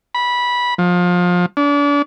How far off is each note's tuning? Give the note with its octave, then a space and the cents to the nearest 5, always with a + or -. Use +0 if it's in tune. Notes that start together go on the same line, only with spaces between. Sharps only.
B5 -15
F3 +25
D4 -35